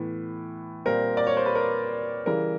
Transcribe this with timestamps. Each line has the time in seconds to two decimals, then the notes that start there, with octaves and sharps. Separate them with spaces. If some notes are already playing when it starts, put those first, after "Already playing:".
Already playing: A2 E3 B3
0.85 A#2 G3 C4 A#4
1.17 D5
1.27 C#5
1.37 C5
1.46 B4
1.55 A#4
2.26 C#3 E3 G3 A#4